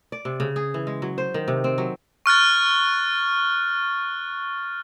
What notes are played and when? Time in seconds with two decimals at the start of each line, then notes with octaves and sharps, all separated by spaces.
0.12 D5
0.25 C3
0.40 C#3
0.56 G#4
0.74 E3
0.87 G#3
1.02 F#3
1.18 C5
1.34 D#3
1.48 C3
1.64 C4
1.78 F#3
2.26 C#6 F6 F#6 A6